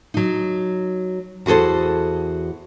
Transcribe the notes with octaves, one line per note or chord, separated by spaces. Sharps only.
F#3 D#4
E2 F#4 G#4 A4 C5